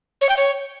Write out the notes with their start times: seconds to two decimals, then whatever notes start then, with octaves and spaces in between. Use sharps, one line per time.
0.21 C#5
0.29 G5
0.37 C#5